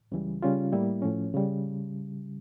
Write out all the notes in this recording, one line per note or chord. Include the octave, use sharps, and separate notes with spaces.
C#2 C#3 E3 G3
C#3 G3 C#4 F4
A2 G3 A#3 E4
A2 F3 C#4
C#3 G3